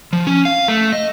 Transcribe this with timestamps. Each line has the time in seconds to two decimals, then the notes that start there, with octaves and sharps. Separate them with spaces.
0.13 F3
0.27 C#4
0.45 F5
0.68 A3
0.93 D#5